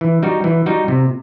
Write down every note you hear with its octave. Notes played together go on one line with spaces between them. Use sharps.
E3
G3 D#4 F#4
E3
G3 D#4 F#4
C3